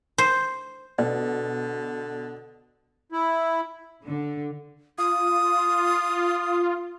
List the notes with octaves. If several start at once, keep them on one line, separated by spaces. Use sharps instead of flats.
C5
B2 D3 D5
E4
D3
F4 D#6